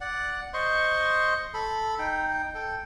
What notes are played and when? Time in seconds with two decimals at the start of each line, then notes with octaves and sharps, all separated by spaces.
0.01 D5 F#5
0.54 C5 D#5 C6 C#6
1.54 A4 B5
1.99 D#4 G5
2.55 A4 G5